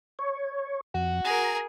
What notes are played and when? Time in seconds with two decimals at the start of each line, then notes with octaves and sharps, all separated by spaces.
0.19 C#5
0.94 F2 F#4
1.24 G#4 A#4 A#5